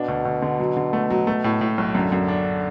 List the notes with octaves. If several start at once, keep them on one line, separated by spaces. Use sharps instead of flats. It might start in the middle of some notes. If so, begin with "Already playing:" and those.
Already playing: B2 D4
D2
D2
D3
F#3
D3
A3
F#3
A3
A2
A2
B1
F#2 D3
F#2
D4